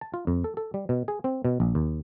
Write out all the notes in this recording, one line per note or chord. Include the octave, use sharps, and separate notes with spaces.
A5
F4
F2
A4
A4
G3
B2
G#4
C4
B2
A#1
D#2